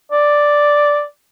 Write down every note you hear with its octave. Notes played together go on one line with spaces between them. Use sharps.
D5